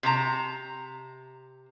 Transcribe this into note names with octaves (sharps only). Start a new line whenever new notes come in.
C3 A5 A#5